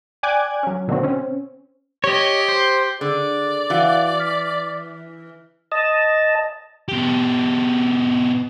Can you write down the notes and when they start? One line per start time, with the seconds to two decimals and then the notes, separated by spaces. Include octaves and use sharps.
0.23 D5 G5 G#5 D6 F#6 G#6
0.63 F#3 C#4
0.88 B2 D3 D#3 A#3 C4 F#4
1.03 C4 C#4
2.04 G4 C#5 D#5
2.48 C5
3.01 D3 G#4 D5
3.70 E3 F#4 F5 F#5
4.19 F6 B6
5.72 D#5 A5
6.88 B2 G4